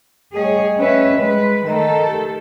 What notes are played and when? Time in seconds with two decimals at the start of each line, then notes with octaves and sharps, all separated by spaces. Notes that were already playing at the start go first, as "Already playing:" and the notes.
0.35 G3 A3 G#4 C#5 D#5
0.77 C#4 B4 E5
1.18 G#3 B4
1.66 D#3 A3 A4 D#5 A#5
2.07 G4